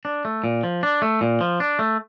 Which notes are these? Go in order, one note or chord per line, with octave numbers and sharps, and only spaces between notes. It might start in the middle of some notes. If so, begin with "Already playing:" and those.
D4
A3
A#2
F3
D4
A3
A#2
F3
D4
A3